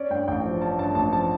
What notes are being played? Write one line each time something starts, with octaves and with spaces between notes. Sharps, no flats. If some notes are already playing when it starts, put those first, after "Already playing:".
Already playing: C#4 D5
G2 G5
A1 G5
F3
C#4 A5
G2 A5
A1 A5
F3 A5